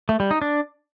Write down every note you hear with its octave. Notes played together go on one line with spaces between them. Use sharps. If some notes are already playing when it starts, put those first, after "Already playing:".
A3
G3
D#4
D4